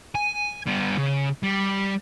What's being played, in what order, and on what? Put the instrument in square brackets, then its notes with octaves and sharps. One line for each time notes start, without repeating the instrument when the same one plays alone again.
[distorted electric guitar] G#5
G3 B3
C#3
G3